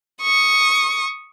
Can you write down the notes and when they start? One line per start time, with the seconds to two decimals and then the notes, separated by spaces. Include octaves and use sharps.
0.22 C#6 D#6